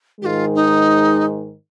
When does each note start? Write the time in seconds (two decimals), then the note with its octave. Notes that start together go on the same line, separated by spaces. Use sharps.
0.21 G#2 D#3 G#3 F4 G4
0.54 D#4